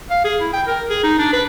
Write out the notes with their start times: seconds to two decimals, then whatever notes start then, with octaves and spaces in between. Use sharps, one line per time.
0.10 F5
0.24 G#4
0.40 E4
0.53 G5
0.67 A#4
0.89 G#4
1.03 D#4
1.19 D4
1.33 B4